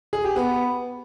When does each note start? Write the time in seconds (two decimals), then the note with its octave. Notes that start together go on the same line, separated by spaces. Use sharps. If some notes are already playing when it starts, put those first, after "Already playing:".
0.13 G#4
0.24 G4
0.36 B3